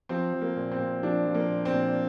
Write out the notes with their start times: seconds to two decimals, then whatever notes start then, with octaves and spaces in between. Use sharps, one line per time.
0.09 F3 C4
0.33 F3
0.41 A#3
0.56 A#2
0.71 C4
0.79 A#2
1.03 F3 D4
1.27 F3
1.34 A#3
1.50 A#2
1.65 C4
1.73 A#2